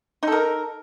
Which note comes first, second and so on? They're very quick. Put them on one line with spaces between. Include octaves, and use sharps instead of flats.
D#4 A4 A#4